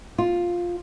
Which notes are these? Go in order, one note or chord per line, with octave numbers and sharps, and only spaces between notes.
F4